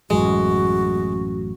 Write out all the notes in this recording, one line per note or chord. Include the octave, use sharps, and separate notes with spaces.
A1 F#2 G#3 F#4